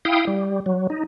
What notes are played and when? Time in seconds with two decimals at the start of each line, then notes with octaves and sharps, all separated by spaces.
0.05 E4 F5 G5 D#6
0.27 G3
0.66 F#3
0.90 D#4